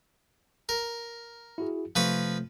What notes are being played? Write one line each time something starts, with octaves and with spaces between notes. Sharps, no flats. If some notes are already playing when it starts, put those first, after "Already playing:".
A#4
E4 F#4 G#4
C3 F3 A3 B4 C#6